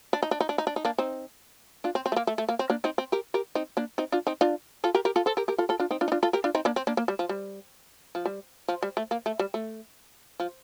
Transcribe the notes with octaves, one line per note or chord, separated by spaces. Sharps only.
D4
D#4
D4
D#4
D4
D#4
D4
D#4
A#3 D4
C4 D#4
D4 F4
C4
C4
A3
A#3
A3
A3
A#3
C4
A#3 D4
C4 D#4
C4
G4 A#4
G4 A#4
C4 D#4
A#3 D4
C4 D#4
D4 F4
C4 D#4
D4 F4
F4 A4
G4 A#4
G4 A#4
F4 A4
A4 C5
G4 A#4
G4 A#4
F4 A4
F4 A4
D4 F4
C4 D#4
D4 F4
D#4
D4 F4
F4 A4
G4 A#4
D4 F4
C4 D#4
A#3 D4
C4
A#3 D4
A#3
G3
F3
G3
F3
G3
F3
G3
A3
A#3
A3
G3
A3
F3